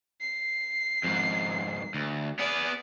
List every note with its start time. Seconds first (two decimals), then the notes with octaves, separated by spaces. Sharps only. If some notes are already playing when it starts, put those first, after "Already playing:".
0.21 C7
1.04 F2 G#2
1.94 D2
2.39 B3 G#4 D5